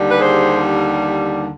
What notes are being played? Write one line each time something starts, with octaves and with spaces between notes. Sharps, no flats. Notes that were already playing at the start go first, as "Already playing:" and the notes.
Already playing: D#2 D3 G3
B4
G#4 C5